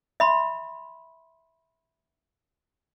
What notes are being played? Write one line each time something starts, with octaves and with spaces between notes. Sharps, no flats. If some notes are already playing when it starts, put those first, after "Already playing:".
E5 B5 C6